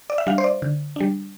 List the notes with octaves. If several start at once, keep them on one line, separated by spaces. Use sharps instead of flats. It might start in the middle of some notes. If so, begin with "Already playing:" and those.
D5
E5
G3 D4 F5
C5
D5
D3
G3 D4